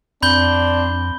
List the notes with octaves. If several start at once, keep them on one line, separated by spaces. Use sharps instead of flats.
F2 C4 D4 B5 G6 G7